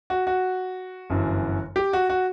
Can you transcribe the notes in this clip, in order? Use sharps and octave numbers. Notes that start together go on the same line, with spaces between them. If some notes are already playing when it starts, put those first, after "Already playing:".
F#4
F#4
G1 F#2 E3
G4
F#4
F#4